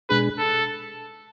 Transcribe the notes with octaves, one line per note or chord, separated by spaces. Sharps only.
B2 G#3 D4 G#4 B4
A4